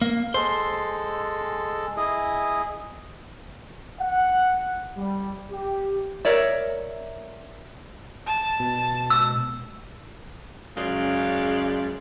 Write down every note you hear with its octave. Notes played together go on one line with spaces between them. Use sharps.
A#3
G#3 A4 C5
E4 G#4 D#5
F#5
G3
G4
A#4 C#5 D5 E5
A5
B2
E6
F#2 C#3 G#3 D5 F5